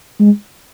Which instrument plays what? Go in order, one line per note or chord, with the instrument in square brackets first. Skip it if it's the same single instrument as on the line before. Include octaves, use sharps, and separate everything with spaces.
[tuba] G#3